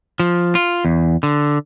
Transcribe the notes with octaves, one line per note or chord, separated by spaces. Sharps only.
F3
F4
E2
D3